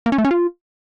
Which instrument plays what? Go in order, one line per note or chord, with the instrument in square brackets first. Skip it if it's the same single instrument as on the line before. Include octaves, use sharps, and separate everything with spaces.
[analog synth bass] A#3
C#4
A3
C#4
F4